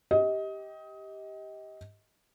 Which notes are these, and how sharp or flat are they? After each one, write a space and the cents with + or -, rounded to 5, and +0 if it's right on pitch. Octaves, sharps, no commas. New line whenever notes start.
G4 +0 D#5 +25